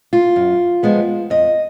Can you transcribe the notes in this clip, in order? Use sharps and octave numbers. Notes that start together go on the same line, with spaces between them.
F4
F#2
F3 G#3 B3
F2 D#5